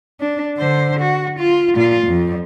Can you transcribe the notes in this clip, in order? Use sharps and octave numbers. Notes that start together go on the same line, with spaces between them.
D4
D3 C5
F#4
F4
A#2 F4
F2